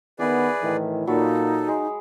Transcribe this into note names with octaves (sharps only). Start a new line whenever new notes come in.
D#3 B3 E4 G#4 B4 D5
A2 D#3 E3
A#2 F#3 D#4 A4 B5
G#3